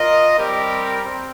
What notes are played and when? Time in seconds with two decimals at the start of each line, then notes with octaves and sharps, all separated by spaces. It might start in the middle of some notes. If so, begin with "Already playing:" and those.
Already playing: F4 A#4 D#5
0.38 G3 C4 G4 A#4
1.02 C4